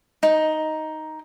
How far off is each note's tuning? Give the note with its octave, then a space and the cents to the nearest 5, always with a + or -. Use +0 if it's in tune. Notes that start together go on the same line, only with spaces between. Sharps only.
D#4 +5